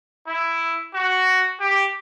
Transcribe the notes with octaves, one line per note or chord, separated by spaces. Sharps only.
E4
F#4
G4